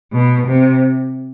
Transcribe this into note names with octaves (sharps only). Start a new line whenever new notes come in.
B2
C3